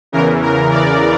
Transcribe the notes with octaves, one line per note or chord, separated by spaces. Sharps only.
E2 C#3 E3 A#4
A#4
D5